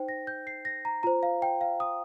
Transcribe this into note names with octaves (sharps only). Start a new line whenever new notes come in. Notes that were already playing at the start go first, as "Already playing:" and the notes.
Already playing: D#4 C5 G5
A#6
G6
C7
A#6
A#5
F4 C5 A#5
F5
G5
F5
D#6